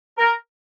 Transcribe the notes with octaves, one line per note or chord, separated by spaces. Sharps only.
A#4